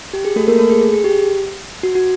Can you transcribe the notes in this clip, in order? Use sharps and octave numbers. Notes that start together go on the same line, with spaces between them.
G4
G#4
A3 A4
A#3 A#4
A3 A4
G#4
G#4
G#4
G4
F#4
F#4